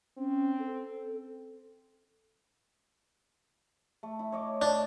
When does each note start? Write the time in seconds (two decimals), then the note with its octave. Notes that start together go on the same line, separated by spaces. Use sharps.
0.18 C4 C#4
0.59 A4
4.03 A3
4.19 E4
4.32 C#5 D#5 D6
4.62 D4